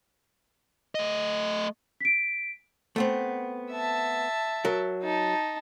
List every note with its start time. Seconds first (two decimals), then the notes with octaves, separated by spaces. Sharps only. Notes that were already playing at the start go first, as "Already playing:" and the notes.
0.95 A3 D#5
2.00 B6 D7
2.96 A3 B3 C4
3.71 E5 A5
4.65 F#3 A#4
5.03 D#4 A5